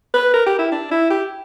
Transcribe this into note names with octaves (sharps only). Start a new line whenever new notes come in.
B4
A#4
G4
E4
D4
E4
G4